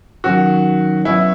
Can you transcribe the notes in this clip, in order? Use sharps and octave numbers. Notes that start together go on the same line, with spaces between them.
D#3 F#3 C#4 F#4
B2 F#3 C#4 E4 F#4